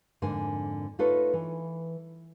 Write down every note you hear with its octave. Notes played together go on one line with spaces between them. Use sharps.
F2 G#2 D3 A#3 G#5
A3 D#4 F4 A4 B4 C#5
E3